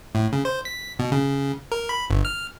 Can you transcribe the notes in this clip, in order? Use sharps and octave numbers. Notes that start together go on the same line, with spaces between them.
A2
C#3
C5
B6
B2
C#3
A#4
B5
G1
F6